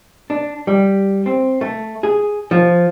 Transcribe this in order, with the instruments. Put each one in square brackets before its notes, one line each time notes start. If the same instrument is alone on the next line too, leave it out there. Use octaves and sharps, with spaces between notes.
[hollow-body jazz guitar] D4
G3
C4
A3
G#4
F3